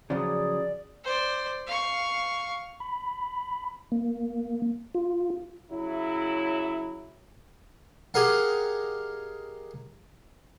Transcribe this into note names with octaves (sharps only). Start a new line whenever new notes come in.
C#3 F3 F#3 G#4 D5
C5 D5
F5 C#6
B5
A#3
F4
C#3 F#3 E4
G4 G#4 A#4 D#5 F5 F#5